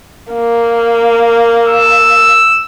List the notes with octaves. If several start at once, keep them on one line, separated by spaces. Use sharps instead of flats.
A#3
E6